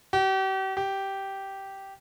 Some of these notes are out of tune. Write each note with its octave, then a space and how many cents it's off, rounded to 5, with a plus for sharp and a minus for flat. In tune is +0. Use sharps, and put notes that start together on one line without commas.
G4 -40
G4 -10